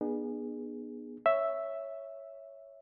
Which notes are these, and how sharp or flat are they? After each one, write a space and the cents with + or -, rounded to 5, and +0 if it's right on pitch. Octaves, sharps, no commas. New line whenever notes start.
B3 -25 D4 +45 G#4 -10
C#5 +0 E5 +0